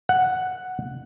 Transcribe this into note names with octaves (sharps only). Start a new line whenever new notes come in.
F#5